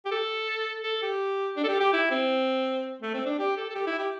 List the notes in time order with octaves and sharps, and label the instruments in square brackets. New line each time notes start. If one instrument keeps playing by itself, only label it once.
[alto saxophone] G4
A4
A4
G4
D4
A4
G4
G4
E4
C4
A3
C4
D4
G4
A4
A4
G4
E4
G4